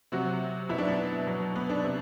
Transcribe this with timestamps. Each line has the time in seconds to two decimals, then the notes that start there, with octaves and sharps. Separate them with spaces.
0.12 C3 F#3 F#4
0.69 B2 F#3 E4
0.78 D4
0.88 B3
1.27 B2 F#3
1.56 B3
1.70 D4
1.84 C3